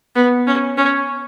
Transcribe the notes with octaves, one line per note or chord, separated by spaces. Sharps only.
B3
C#4
C#4